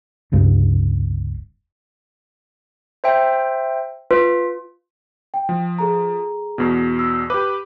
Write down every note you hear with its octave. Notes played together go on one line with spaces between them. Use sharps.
F1 C#2 G2
C5 E5 G5
F4 B4
G5
F3
G#4 A4 A#5
E2 B2
E6
G4 B4 D6